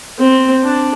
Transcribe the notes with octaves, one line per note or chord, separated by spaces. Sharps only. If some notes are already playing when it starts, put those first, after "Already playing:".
C4
D4